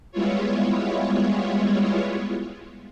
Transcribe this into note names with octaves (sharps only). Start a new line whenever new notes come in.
G3 G#3 B3 E4 F4 C#5